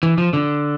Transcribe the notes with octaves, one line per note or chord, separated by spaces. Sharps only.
E3
F3
D3